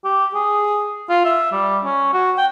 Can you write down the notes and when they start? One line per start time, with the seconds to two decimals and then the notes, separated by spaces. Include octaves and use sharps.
0.04 G4
0.34 G#4
1.09 F4
1.25 E5
1.52 G3
1.84 C#4
2.13 F#4
2.37 G5